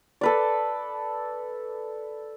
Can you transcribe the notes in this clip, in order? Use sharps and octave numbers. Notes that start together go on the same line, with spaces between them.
A4 B4 D5